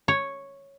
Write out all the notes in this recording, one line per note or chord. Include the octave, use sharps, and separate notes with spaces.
C#5